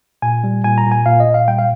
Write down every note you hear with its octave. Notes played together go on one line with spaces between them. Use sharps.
A#2 G#5
G3
A#2 G#5
A#5
A#2
G#5
A#2 F5
D#5
A#2
F5
G3 G5
F5